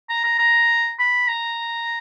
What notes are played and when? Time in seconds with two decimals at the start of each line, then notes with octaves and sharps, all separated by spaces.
0.09 A#5
0.24 A#5
0.39 A#5
0.99 B5
1.28 A#5